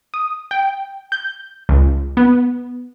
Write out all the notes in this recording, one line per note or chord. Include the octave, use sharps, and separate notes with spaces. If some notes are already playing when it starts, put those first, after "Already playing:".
D#6
G5
G6
C#2
B3